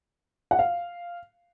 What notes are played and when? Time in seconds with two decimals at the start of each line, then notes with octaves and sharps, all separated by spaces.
0.51 F#5
0.59 F5